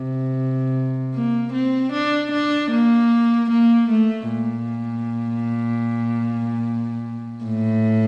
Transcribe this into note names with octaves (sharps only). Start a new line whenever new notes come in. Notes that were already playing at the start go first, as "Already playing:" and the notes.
Already playing: C3
A#3
C4
D4
D4
A#3
A#3
A3
A#2
A2